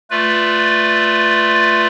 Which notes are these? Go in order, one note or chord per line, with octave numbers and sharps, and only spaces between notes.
A3 F4 B4 D5